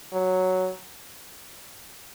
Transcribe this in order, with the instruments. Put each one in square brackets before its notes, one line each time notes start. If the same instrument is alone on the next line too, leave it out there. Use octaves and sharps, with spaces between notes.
[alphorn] F#3